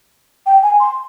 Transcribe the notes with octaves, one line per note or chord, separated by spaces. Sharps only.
G5
G#5
C6